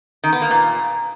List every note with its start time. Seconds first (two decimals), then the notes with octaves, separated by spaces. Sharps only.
0.24 D#3
0.33 B3
0.42 A#3
0.51 A#2